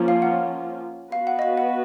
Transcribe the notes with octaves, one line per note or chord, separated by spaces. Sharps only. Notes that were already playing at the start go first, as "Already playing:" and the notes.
Already playing: F3 A#3 C#4 F4
F5
F#5
B3 F#4 B4 F5
F#5
D#5
F5
F#5